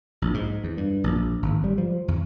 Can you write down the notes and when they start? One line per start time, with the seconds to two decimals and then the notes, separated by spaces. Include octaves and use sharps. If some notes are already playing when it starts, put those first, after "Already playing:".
0.22 A#1
0.34 G#2
0.64 E2
0.77 G2
1.04 A#1
1.42 G#1
1.64 G3
1.78 F3
2.08 E2